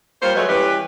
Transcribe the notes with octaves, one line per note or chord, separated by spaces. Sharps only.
G3 A#3 F4 C5 C#5
F#3 G#3 A3 B4 C#5 D#5
E3 G3 C#4 G4 B4